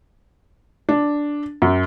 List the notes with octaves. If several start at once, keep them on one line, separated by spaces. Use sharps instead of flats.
D4
F#2